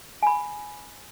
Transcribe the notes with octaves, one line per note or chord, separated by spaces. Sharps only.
G#5 B5